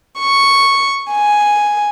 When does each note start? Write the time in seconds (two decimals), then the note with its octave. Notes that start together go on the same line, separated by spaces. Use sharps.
0.19 C#6
1.13 G#5